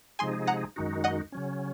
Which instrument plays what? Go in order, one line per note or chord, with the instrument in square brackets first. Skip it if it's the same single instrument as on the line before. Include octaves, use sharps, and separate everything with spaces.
[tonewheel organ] C3 F3 G#3 D#4 G#4 [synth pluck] G#5 C6
[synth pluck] F#5 A#5
[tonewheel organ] F#2 D#3 G#3 D#4 F#4
[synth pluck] D#5 F#5
[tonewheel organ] C#3 F#3 C#4